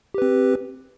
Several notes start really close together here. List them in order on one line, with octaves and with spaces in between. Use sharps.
G4 B4 C4